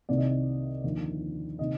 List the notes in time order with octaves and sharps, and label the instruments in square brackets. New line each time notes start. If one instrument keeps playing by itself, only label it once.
[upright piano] C2 C3 D#3 D5
D#5
D5
D#2 D3 F3
C3 D#3 D#5